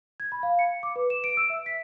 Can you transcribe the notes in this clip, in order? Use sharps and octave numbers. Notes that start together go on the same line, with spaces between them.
G#6
B5
F5
C#7
D6
B4
E7
D7
E6
E5
B6